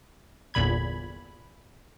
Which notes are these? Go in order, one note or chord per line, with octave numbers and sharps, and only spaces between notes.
G1 E2 A#2 B5 G#6